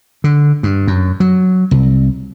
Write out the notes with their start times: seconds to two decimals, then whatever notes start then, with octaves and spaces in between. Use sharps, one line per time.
0.24 D3
0.63 G2
0.87 F#2
1.20 F#3
1.71 C2